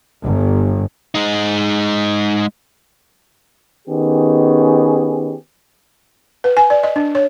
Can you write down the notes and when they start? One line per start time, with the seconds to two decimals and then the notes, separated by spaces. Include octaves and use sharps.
0.23 G1
1.15 G#3 D#4
3.88 D#3 B3 C#4 G4 G#4
6.44 B4
6.57 G#5
6.70 D5
6.83 D#5
6.96 D4
7.15 C#5